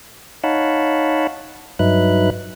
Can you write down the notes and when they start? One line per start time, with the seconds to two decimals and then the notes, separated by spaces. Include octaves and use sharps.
0.44 D#4 C#5 F5 F#5 A5 B5
1.79 G2 F#3 D#4 B4 E5 F#6